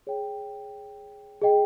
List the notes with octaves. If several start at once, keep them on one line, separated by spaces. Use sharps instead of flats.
G#4 C#5 G5
G#4 D#5 G5